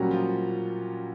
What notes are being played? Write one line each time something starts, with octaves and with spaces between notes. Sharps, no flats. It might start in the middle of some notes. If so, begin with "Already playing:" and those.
Already playing: A#2 F#3 G3 A#3 C#4 F#4
F3 F4